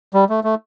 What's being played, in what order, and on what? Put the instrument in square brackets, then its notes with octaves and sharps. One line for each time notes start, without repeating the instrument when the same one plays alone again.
[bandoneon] G3
A3
A3